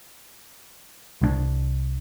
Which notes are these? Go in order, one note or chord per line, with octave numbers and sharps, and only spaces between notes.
C2 F3 D4